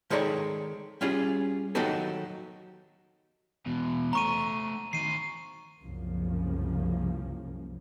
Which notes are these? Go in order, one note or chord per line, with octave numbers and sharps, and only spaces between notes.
D#3 G#3 A4 C#5 D5 A#5
G3 C#4 F4 G#4
D#3 F#3 D#4 F#4 G4 A4
E2 B2
A3 C5 A#5 C#6 D#7
D#3 C5 C7 D#7
C2 F#2 C#3 F3 A#3